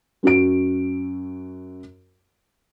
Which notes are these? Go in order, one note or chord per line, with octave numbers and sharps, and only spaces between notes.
F#2 F#4 D7